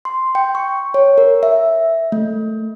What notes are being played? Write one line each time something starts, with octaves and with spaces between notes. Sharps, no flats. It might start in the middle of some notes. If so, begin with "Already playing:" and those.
C6
G5
C#6
C#5
A#4
E5
A3